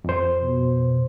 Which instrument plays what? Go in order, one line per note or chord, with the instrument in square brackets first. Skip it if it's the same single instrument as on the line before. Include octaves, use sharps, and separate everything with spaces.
[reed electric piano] F2 C5
[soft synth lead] B2